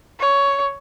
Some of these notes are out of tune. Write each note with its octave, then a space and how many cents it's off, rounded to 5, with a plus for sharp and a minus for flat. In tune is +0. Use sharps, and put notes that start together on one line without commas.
C#5 +10